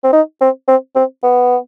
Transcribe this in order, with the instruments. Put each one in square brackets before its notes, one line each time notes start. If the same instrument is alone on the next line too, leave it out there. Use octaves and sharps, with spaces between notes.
[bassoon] C4
D#4
C4
C4
C4
B3